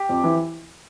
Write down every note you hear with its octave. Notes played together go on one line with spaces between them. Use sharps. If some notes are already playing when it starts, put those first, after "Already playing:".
Already playing: G4
F2
E3